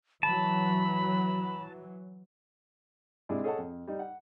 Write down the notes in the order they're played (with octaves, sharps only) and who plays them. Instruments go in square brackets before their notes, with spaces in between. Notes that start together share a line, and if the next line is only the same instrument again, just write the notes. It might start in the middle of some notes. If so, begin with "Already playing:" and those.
[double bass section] E3 F#3 [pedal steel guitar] A5 [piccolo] B5
[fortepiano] G#2 C3 D4 E4 G#4
G#4 A4 C#5 D#5 F#5 A5
F2
G3 D#4
F#5